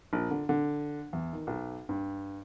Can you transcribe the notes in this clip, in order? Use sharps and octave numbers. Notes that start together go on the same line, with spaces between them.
A#1
D3
D3
E2
D#3
B1
G2